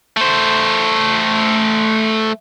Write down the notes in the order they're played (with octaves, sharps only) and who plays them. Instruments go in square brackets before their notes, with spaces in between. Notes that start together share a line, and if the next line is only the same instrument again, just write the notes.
[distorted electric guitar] A3 C5